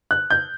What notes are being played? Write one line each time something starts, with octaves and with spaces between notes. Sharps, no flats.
F#6
G6